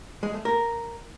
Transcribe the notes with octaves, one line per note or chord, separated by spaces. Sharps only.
G#3
A3
A#4